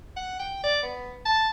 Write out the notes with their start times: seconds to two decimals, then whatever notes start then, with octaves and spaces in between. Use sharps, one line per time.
0.16 F#5
0.39 G5
0.64 D5
0.83 B3
1.26 A5